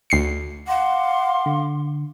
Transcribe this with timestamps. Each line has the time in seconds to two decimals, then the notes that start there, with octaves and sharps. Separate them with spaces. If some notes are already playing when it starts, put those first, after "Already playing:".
0.10 D2 C7 C#7
0.68 F5 F#5 C6 D6
1.46 D3